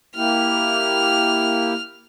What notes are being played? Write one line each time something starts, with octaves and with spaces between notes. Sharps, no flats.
A#3 E4 G4 F6